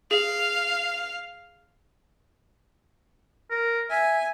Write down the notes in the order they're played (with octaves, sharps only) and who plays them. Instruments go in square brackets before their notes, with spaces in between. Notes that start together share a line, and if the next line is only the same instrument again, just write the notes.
[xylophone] G#4 [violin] F5
[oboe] A#4
[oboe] E5 [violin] G#5